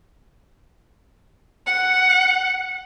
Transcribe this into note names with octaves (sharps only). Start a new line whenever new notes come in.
F#5